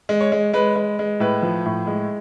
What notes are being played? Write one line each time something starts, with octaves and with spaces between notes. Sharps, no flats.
G#3
C#5
G#3
G#3 B4
G#3
G#3
A2 B4
F3
A2
G#3